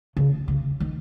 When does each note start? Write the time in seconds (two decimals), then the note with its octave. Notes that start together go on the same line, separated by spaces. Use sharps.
0.17 C#3
0.48 C#3
0.80 D#3